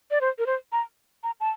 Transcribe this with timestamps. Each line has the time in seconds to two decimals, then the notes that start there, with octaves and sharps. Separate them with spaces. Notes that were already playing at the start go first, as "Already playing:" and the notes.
0.11 D5
0.21 C5
0.39 A#4
0.46 C5
0.72 A#5
1.24 A#5
1.40 A5